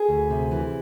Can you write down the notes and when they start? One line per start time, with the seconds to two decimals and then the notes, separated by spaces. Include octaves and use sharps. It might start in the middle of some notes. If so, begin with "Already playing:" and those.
Already playing: G#4
0.09 D2
0.30 C3
0.51 E3